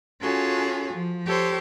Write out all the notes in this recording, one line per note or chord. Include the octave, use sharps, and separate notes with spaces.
C#4 F4 F#4 G#4 A4
F3
G4 A4 C5 C#5